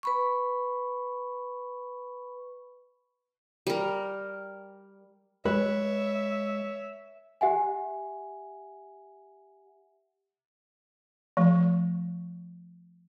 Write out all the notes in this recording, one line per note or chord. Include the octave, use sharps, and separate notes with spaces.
B4 B5 C#6
G3 A#4
G#3 B4 C#5 E5
G4 E5 F#5 G#5
F3 A3